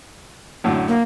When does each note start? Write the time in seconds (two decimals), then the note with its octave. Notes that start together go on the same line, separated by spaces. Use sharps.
0.64 F#2 A2 D3
0.88 A#3